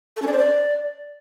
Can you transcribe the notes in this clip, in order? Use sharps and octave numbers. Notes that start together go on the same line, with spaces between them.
A4
C#4
D5
C5
D5